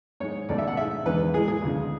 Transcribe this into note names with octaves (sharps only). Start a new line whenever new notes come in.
G#2 G#3 C#5
C#2 B2 A3 D5
E5
F#5
G#2 G#3 E5
E2 D3 G#3 B4
A2 E3 G#3 G#4
G#4
D2 C#3 G#3